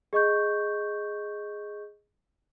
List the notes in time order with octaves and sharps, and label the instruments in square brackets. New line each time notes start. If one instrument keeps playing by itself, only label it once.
[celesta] G#4 D#5 C#6 G6